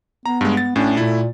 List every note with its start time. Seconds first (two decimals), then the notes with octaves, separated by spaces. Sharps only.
0.26 B3 A#5
0.41 G2 G#3
0.57 A6
0.76 A2 C#4 D4
0.97 A#2 A3 E4